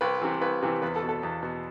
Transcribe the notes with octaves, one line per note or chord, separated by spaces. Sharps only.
C2 B4
C3 E3
C2 B4
C3 E3
E2 B4
A4
B2
A4
E2
B2